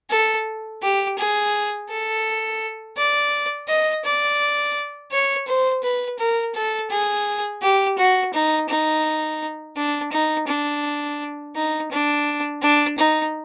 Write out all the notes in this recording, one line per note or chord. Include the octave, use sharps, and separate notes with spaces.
A4
G4
G#4
A4
D5
D#5
D5
C#5
C5
B4
A#4
A4
G#4
G4
F#4
D#4
D#4
D4
D#4
D4
D#4
D4
D4
D#4